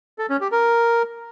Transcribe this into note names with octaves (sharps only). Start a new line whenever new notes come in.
A4
C#4
G4
A#4